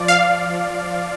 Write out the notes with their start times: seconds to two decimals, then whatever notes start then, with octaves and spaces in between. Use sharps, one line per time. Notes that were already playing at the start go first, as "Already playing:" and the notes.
Already playing: F3 D5
0.08 F5